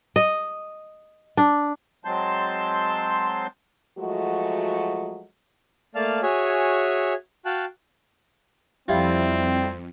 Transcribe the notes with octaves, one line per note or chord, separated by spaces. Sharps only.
D#5
D4
F#3 G#3 C4 A5 C6 G6
F3 F#3 G#3 A3 F#4
A3 A#3 D5 F5 A5 F6
F#4 G#4 C#5 E5 G#5
F#4 F5 G5 A5 F#6
F2 G3 C4 E4 F4